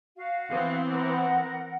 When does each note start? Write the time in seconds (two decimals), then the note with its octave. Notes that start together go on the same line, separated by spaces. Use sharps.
0.17 F#4 F5
0.49 E3 B3 C4
0.91 A#4 F#5